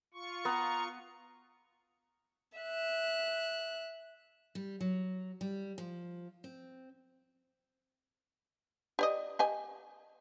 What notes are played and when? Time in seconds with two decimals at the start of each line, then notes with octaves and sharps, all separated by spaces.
0.14 F4 C#6
0.45 B3 A#5
2.58 E5 F#6
4.55 G3
4.81 F#3
5.41 G3
5.78 F3
6.44 C4
8.99 G4 D5 D#5
9.39 G4 D#5 G#5